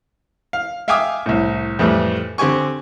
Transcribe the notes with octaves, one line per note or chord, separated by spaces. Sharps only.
F5
E5 F5 G5 G#5 D6 D#6
C2 A2
F2 A2 E3 G3 A3
D3 C4 G4 G#5 C#6